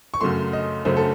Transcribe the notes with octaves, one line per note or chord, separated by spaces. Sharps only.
C#6
F#2 C#3 F#3 A3 C6
D#5
F#2 C#3 F#3 A3 C5
A4